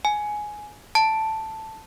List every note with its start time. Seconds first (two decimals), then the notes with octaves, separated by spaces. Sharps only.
0.05 G#5
0.95 A5